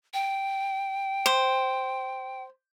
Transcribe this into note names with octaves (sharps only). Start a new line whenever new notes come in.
G5
C5